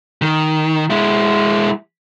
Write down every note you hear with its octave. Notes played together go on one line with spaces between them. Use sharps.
D#3
G#3 E4